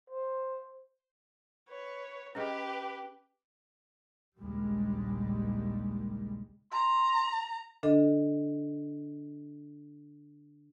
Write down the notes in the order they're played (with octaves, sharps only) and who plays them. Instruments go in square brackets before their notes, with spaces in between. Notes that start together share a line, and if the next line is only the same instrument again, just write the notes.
[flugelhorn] C5
[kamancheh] B4 C#5
[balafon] C#4 G#4 D#5 [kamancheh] G4 B4
[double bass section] A#1 D#2 C#3 G3 G#3
[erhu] A#5 [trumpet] C6
[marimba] D3 D4 A4 D#5